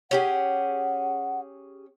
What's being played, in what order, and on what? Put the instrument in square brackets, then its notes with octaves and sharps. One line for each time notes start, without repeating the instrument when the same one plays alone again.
[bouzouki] C#4 G4 G#4 [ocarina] F#5